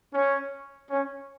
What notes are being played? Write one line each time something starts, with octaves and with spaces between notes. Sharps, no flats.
C#4
C#4